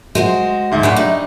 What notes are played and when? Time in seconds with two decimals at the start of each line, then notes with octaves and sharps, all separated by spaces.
0.15 G#3 F#4 C5
0.72 D2 G#2 E5
0.83 G2 G#3 D4 B4 F#5
0.96 D#4